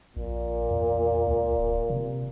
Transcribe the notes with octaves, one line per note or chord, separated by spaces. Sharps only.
A#1 A#2
E2
C#2
D1
C3